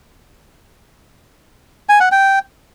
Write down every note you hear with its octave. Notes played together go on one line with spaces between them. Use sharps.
G#5
F#5
G5